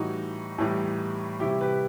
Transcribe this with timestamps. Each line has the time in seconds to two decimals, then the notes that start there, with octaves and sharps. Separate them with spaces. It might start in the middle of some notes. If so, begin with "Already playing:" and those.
Already playing: A2 E3 G3 D#4 F#4
0.58 A2 E3 G3
1.40 C3 E3 G3 E4 G4
1.61 G4 B4